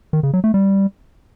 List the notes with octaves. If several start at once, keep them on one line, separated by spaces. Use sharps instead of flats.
D#3
C#3
F#3
A3
G3